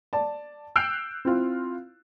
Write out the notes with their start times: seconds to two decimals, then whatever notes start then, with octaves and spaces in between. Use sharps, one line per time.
0.13 D5 A5
0.76 E6 F#6 G6 C7 D7 F7
1.25 C4 E4 F4